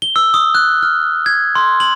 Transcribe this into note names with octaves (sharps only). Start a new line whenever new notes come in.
G7
E6
D#6
F#6
F6
G#6
C6
F#7